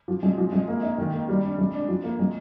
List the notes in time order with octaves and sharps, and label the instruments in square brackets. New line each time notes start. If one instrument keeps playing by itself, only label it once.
[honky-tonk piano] F3
G#3
F3
G#3
A#3
D#4
D#3
A#3
G3
D4
G#3
D4
F3
A#3
G#3